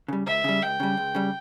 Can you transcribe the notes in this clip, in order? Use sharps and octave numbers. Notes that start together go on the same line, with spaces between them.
C#3 G3
C#2 E5
C#3 G3
C#2 G5
C#3 G3
C#2
C#3 G3